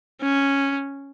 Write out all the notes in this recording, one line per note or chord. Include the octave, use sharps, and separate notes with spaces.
C#4